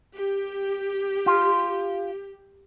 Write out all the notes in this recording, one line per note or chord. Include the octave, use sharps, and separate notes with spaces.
G4
F4